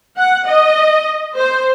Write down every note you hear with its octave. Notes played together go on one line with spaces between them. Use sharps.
F#5
D#5
C5